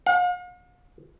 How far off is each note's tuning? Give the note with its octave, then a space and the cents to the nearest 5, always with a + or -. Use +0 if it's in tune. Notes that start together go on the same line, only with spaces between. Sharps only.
F5 +45